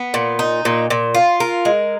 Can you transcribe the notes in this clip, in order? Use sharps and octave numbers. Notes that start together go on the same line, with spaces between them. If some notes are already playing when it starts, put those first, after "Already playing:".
Already playing: B3
A#2
D#4
A#2
A#2
F4
A#4
G#3